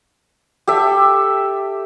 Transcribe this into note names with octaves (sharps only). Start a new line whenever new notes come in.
G4 A4 E5